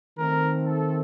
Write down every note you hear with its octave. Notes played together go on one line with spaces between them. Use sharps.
D#3 A3 C4 A#4
A4